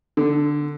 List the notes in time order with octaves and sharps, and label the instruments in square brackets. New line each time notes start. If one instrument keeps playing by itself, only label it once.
[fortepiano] D3